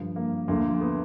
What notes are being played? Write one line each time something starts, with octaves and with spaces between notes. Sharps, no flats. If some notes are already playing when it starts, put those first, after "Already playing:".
Already playing: G2 D3 F3
A#3
D2 D3 F3 A#3
B3